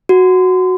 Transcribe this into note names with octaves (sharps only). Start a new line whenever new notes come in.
F#4